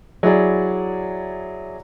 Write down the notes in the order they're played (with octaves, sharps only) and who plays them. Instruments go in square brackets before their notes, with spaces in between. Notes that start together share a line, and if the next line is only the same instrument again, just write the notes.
[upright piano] F#3 E4 G#4 D5